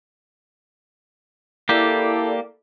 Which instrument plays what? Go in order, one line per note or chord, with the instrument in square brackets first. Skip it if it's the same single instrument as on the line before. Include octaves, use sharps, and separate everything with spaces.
[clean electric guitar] A#3 G4 [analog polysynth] E4 A4 D5